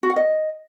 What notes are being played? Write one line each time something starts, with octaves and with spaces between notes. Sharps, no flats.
F#4
F#5
D#5